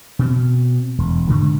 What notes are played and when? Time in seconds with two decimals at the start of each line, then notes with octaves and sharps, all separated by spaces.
0.19 B2 C4
0.98 E1
1.28 G#2 D3 D#3